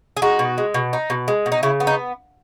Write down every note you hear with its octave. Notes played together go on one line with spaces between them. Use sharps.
G#4
G#3 D#4 F#4
B2
G#3
B2
D#4
B2
G#3
B2
D#4
C#3 E4
B3
D#4